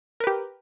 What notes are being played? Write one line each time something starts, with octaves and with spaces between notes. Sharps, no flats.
G4 A#4 B4